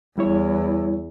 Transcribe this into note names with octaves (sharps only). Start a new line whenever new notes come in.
E2 G3 E4 C#5